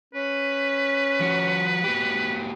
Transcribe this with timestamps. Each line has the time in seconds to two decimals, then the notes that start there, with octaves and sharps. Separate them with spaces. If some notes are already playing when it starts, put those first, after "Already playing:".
0.14 C#4 B4
1.20 F3 F#4
1.84 A#3 F#4 G4